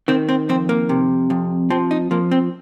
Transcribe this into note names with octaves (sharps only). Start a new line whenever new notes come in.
D#3 C4
C4
F2 C4
A#3
C3
F2
F3 C4
D#4
F3 A#3
C4